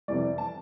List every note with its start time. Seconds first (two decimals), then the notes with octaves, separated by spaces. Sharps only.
0.08 F2 C3 E3 G3 D5
0.38 A5